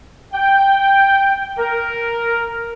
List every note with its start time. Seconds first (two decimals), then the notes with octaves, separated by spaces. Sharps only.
0.33 G5
1.58 A#4